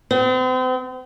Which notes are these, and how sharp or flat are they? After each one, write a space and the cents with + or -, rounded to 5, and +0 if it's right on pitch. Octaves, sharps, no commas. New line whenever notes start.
C4 -40